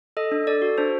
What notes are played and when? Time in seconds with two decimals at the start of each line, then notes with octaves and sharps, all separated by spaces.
0.17 A4 D#5
0.31 D4
0.47 A4 D5
0.62 F#4
0.78 D4 C5